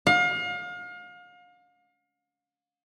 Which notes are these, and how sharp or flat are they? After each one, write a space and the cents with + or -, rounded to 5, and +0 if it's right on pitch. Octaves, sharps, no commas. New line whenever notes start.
F5 +35